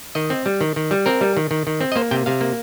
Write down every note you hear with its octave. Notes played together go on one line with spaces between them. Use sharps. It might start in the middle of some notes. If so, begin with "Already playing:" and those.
D#3 D#5
C4
G3
D#3
D#3
G3
C4 A#4
G3
D#3
D#3
D#3
C4
D#5
A#3 C5
C3 G5
C3 F5
A#3